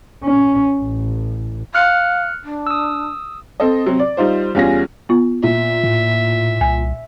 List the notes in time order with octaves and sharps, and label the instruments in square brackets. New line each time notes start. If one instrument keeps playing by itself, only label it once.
[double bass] C#4
A1
[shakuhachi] F5 [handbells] F6 F#6 C#7
[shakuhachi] D4
[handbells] D#6 E6
[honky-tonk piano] C4 A4 D#5
C3 F#3 C4
D5
G3 D#4 F4 C5
E2 G3 C#4 F4 G#4 A#6
[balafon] B3 F4
[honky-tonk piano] A#2 [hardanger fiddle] E5
[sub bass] A2
[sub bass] C2 [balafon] G#5